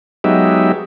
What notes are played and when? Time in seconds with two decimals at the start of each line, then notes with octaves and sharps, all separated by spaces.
0.24 F#3 G#3 B3 D#4 G4 E5